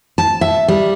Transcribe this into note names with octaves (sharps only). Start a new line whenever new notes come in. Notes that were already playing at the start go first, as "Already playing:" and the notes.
A5
E5
G3